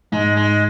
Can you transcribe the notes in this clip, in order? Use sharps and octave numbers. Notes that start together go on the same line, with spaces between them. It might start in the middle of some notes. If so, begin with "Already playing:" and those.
G#2 G#3
G#3